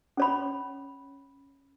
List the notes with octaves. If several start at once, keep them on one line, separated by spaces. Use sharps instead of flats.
C#4 C#5 B5